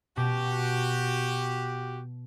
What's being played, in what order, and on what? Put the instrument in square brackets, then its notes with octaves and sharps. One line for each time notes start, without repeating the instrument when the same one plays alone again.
[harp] B2 [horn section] F#4 G4